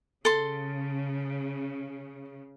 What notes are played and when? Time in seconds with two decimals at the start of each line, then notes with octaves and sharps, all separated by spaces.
0.25 C#3 A4 C6